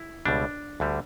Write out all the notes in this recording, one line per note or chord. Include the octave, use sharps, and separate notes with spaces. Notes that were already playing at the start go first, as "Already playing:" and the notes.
Already playing: E4
C#2 B2 G3 D4
D2 D3 G3